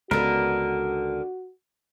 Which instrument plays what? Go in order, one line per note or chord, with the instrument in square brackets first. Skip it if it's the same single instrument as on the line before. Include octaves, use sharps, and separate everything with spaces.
[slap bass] C#2 [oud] D3 B3 [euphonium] F#4 [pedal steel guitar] A#4